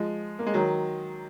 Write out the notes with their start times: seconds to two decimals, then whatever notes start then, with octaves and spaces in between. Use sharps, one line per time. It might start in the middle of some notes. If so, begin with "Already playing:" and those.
Already playing: F3 G#3
0.39 A#3
0.46 G#3
0.54 D#3 F#3